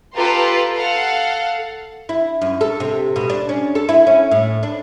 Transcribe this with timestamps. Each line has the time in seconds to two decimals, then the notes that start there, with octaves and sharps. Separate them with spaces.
0.15 F4 G4 A4 B4 A#5 C6
0.75 A4 F5 F#5
2.09 E4
2.41 F#2
2.61 A4
2.80 C3
3.16 B2
3.30 D4
3.49 C#4
3.75 A4
3.89 E4
4.07 C#4
4.31 A2
4.63 D4